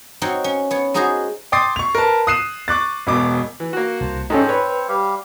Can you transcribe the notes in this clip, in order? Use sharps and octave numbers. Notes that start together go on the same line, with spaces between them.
C4 D#4 F#4 C#5 G5
C#4
B3 C#5
G#3 D#4 F#4 G#4 C5 D#5
G5 C6 D6 D#6 A6 C7
C#6 F7
A#4 B4 A5
D#6 F#6 C7 D#7 E7
C#6 D6 F#6 A6
E1 B2 D6
E3
A#3 F#4 F#5
C2 C5 A5
G#2 C4 C#4 A4 C5 D#5
B4 C#5
G3 G4 F5